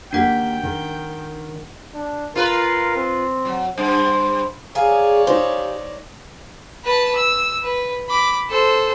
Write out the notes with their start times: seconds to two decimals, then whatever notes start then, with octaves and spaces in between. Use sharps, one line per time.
0.13 D#3 A#3 D4 G4 F#5 G5 B6
0.63 D#3
1.94 D4
2.35 F4 A#4 B4
2.96 C4
3.45 F#3
3.78 G2 C5
4.75 G#4 C#5 D5 F5 G#5 A#5
5.27 D#4 G4 C5
6.84 B4 A5
7.15 E6
7.62 B4
8.09 B5 D6
8.50 A4 C5